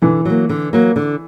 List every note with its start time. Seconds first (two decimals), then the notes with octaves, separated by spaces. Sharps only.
0.02 D3 E3
0.25 F#3 A#3
0.50 D3
0.73 F#3 A#3
0.96 D3